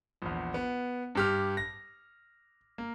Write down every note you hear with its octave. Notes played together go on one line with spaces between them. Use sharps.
A#1 E2
B3
G2 G4 F6
A#6
A#3